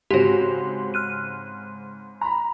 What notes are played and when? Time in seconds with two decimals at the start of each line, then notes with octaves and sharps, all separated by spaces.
0.10 G#2 C#3 C4 F#4 G4
0.94 F6 F#6 D#7
2.21 A#5 B5